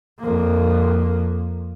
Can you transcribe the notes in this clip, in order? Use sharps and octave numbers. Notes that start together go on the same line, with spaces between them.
F2 A#3